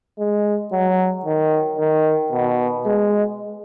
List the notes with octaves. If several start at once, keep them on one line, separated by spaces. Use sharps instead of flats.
G#3
F#3
D#3
D#3
B2
G#3